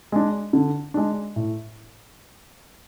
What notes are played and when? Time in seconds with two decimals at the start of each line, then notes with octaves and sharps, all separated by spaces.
0.12 G#3 D4
0.53 D3
0.94 G#3 D4
1.36 A2